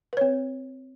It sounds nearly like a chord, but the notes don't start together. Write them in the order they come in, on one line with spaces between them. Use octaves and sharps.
B4 C#5 C4